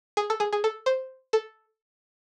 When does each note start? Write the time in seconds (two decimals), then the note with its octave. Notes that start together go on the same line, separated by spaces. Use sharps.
0.17 G#4
0.30 A4
0.40 G#4
0.53 G#4
0.64 A4
0.86 C5
1.33 A4